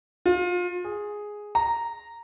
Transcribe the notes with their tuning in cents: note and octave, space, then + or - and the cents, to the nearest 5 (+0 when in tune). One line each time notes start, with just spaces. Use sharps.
F4 +30
G#4 +0
A#5 -5